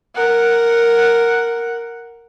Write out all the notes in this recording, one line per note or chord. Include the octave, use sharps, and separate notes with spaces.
A#4 F#5